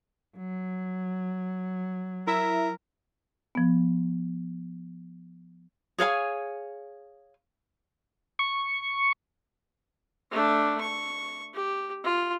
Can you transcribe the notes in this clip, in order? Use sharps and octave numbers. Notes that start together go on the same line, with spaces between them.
F#3
E4 A#4 E5
F3 B3
G#4 C#5 F5 G#5
C#6
A3 D4
C#6
G4
F4